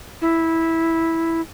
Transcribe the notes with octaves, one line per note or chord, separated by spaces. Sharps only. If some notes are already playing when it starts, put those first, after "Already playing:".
E4